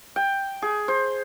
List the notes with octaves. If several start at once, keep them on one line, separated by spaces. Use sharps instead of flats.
G5
G#4
C5